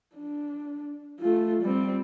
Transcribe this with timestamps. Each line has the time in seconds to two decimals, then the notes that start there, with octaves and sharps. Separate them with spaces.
0.16 D4
1.20 A3 F4
1.62 G3 C4